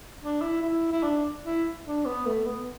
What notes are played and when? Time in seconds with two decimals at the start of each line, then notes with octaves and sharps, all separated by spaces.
0.21 D4
0.42 E4
0.62 E4
0.92 E4
1.03 D4
1.43 E4
1.85 D4
2.05 B3
2.26 A3
2.46 B3